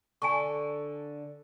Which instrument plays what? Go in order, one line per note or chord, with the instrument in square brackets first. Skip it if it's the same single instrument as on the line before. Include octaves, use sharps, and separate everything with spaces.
[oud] D3 [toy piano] G#5 A5 C#6